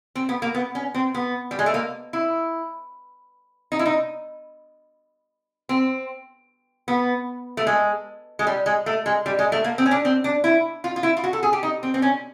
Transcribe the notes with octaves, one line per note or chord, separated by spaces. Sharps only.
C4
B3
A#3
B3
C#4
C4
B3
G3
G#3
A3
A#3
E4
D#4
E4
D#4
C4
B3
A3
G#3
G#3
G3
G#3
A3
G#3
G3
G#3
A3
A#3
C4
C#4
D4
C4
D4
E4
F4
F4
E4
F4
F#4
A4
G#4
G4
D#4
C4
C4
C#4